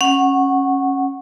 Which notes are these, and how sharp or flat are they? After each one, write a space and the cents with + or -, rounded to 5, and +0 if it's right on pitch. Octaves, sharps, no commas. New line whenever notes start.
C#4 -15 F#5 +0